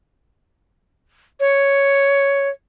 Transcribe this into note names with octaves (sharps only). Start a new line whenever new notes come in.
C#5